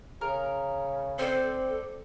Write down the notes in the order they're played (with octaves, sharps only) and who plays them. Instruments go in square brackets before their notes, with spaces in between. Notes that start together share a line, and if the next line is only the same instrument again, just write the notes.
[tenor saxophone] C#3 [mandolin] A#4
[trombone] C4 [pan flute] A4 [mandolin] C5 D5